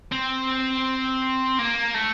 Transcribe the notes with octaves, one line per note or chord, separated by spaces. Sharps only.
C4
A#3
A3